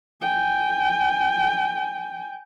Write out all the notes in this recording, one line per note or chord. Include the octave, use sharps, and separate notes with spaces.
G5 G#5